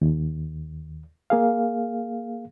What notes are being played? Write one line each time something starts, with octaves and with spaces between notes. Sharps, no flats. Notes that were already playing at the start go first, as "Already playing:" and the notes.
D#2
A#3 G#4 F5